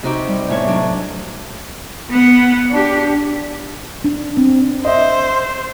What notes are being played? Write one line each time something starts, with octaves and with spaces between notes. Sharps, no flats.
C3 D#4 F#4 G4
G3
E2 A2 C#5
F#3 D4
B3 F#5
D4 G4
D4
C4
C5 D#5 E5